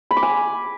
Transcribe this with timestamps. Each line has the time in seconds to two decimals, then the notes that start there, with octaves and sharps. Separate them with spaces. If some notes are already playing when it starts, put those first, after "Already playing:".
0.11 B5
0.17 D6
0.23 G#5